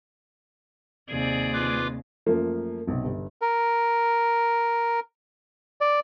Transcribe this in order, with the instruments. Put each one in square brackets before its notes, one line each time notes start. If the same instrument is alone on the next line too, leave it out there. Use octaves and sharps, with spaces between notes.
[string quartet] D#2 [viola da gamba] C3 G#4 D5
[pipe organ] F4 B4 D6
[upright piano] F#2 F3 A3 A#3
B1 C3
G1
[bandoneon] A#4
D5